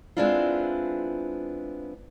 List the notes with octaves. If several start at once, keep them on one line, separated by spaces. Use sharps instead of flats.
G#3 B3 C4 D4 E4 F4